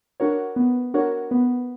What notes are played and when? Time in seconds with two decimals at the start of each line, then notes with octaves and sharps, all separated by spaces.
0.20 D4 F#4 A#4 C#5
0.56 B3
0.94 D4 F#4 A#4 C#5
1.31 B3